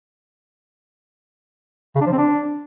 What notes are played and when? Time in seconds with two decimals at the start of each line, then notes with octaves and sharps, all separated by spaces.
1.96 C#3
2.01 D4
2.07 F3
2.12 C4
2.18 D4